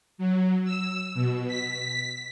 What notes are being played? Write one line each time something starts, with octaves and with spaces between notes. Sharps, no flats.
F#3
E6
B2
B6